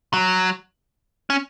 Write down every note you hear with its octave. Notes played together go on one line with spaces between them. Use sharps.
F#3
C#4